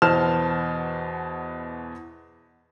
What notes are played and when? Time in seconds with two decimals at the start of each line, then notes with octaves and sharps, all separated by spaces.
0.02 E2 B2 C5 A5 F6 E7